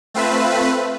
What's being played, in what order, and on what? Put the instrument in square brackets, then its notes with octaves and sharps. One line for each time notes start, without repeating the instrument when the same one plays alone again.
[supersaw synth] A3 C4 F4 B4 E5